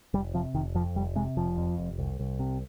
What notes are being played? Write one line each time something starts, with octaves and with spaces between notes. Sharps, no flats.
F1 G3
C3 F3
F1 D#3
F2 F3
F1 G3
C3 G#3
F1 F3
F2
F1
C2
C2
C3